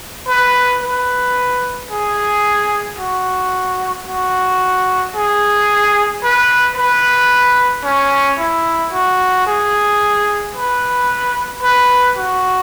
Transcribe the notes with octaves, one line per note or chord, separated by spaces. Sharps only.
B4
B4
G#4
F#4
F#4
G#4
B4
B4
C#4
E4
F#4
G#4
B4
B4
F#4